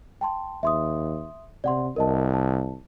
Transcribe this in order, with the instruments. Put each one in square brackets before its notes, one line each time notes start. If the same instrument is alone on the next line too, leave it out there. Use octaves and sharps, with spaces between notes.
[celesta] G5 A5 C6
[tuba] D#2 [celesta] E5 C6 D#6
[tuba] C3 [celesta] D5 F#5 C6
[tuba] C2 [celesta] A#4 D#5 A5
[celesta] A5